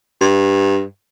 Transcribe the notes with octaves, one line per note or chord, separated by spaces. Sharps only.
G2